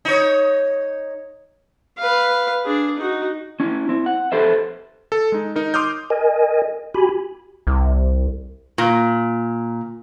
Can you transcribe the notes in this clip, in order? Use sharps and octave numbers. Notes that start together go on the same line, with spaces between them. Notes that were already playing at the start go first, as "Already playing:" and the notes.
D#4 C#5
B4 F5
D4 G#4
D#4 F#4
C#4 E4
C4 E4
F#5
G4 A4 B4 C5 E5
A4
G#3 D#4
D#4 A#4
C6 D6 D#6 F6 G6
A#4 D#5 G#5
F#4 G4 G#5 B5
C2
A#2